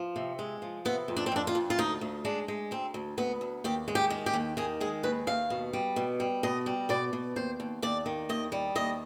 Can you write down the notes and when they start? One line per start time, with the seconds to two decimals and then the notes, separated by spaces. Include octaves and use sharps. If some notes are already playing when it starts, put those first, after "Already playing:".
Already playing: F3
0.16 C3
0.39 G#3
0.62 F3
0.85 C3 B3
1.08 F2
1.16 D4
1.26 C4
1.32 F2 D4
1.47 F4
1.55 F2
1.70 F4
1.78 D2 D#4
2.01 D2
2.25 G#3 D4
2.48 G#3
2.71 D2 C4
2.94 D2
3.17 D2 B3
3.41 D2
3.64 D#2 G4
3.88 G#3
3.95 G4
4.10 D#3
4.26 G4
4.34 D#2
4.57 D#3 G#4
4.81 G#3 G#4
5.03 D#2 B4
5.27 D#2 F5
5.50 B2
5.73 G3
5.96 B2
6.20 G3
6.43 B2 D#5
6.66 G3
6.89 B2 D5
7.13 B2
7.36 D#2 C5
7.60 D#2
7.82 D#2 D5
8.06 D#3
8.29 D#2 D#5
8.52 G3
8.75 D#2 D#5